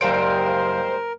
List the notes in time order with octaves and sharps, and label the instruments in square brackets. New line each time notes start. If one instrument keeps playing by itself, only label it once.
[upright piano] F#1 F5 D7 [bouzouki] G3 G#3 D#4 [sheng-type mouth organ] A#4 [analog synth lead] C5